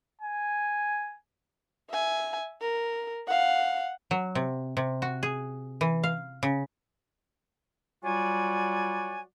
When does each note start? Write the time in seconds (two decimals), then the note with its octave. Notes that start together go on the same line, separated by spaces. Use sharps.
0.22 G#5
1.90 E5 G#5
2.61 A#4
3.27 F5 F#5
4.11 F#3
4.35 C3
4.77 C3
5.02 F#4
5.23 G#4
5.81 E3
6.04 F5
6.43 C#3
8.04 F#3 G3 F4 F#4 D5 G#5